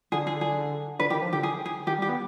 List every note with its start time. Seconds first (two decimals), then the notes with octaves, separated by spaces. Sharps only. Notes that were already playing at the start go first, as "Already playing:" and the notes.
0.12 D3 G#4
0.27 G#4
0.41 G#4
0.99 D3 B4
1.10 D#3 G4
1.22 F3
1.33 D3 G4
1.43 G#4
1.66 G#4
1.87 D#3 G4
1.99 G3
2.02 G4
2.09 B3